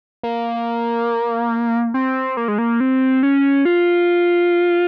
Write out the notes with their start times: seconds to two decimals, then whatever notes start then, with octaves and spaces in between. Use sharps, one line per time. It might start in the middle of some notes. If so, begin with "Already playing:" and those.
0.23 A#3
1.94 C4
2.37 A#3
2.48 G#3
2.58 A#3
2.80 C4
3.23 C#4
3.65 F4